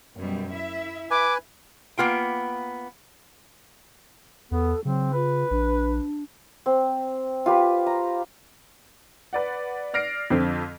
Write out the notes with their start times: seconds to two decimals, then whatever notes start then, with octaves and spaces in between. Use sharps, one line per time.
0.18 F#2 B2 G3
0.52 E4 E5
1.11 B4 G#5 D6
1.98 A#3 B3 F4 G5
4.51 E2 B3 A4
4.85 C#3 F#3 C4
5.13 F4 B4
5.51 A#1 D4
6.66 C4
7.46 F4 G4 B4
7.86 A#5
9.33 B4 D5 F#5
9.94 D5 F6 A#6 C7 D7
10.30 F2 D3 C4